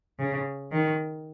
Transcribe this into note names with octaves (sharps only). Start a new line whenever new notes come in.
C#3
D#3